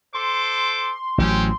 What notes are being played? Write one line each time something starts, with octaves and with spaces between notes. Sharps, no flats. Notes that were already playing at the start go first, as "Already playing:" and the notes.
A4 C5 C6 D6
A1 A2 F#3 C4 C#4 G4